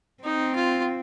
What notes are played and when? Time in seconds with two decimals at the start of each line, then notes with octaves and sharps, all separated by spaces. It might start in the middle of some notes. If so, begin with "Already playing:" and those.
0.24 C4 D#4
0.55 F4